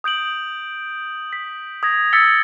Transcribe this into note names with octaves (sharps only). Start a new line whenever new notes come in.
D#6 G6 D7 F#7
B6
D#6 G#6 A#6
D#6 E6 A6 B6 C#7 G7